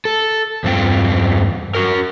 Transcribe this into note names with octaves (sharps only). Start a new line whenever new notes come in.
A4
E2 G2 C4 F4 G5
F#4 A#4